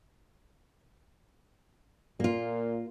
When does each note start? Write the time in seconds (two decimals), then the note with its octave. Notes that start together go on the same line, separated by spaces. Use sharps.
2.20 A#2 A#3 F4